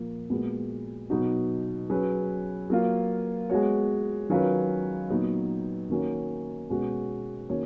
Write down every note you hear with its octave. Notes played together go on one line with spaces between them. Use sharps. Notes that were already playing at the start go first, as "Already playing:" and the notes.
Already playing: A#2 F3 A#3
A#2 G#3 B3 F#4
B2 F#3 B3 D#4 F#4
F#3 C#4 G#4 B4
F#3 A#3 F4
G#3 B3 F#4 C#5
D#3 F#3 C#4 F4 B4
A#2 F#3 B3 D#4
D#3 A#3 C#4 F#4 C#5
B2 G#3 C#4 F#4
D#3 A#3 C#4 F#4 C#5